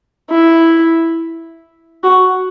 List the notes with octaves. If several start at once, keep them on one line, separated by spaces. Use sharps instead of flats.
E4
F#4